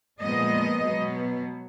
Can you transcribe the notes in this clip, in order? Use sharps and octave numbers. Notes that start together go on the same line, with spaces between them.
A#2 F3 G#3 B3 D#5
B2 F#3 B3